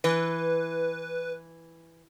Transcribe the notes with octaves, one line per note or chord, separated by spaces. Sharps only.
E3 B4